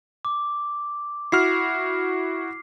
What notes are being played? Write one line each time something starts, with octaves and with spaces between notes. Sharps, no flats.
D6
E4 F#4 F6 C7